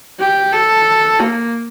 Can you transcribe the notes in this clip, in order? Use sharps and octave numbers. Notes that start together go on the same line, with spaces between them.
G4
A4
A#3